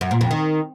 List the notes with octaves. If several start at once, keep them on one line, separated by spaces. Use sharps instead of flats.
F#2
A#2
F2
D#3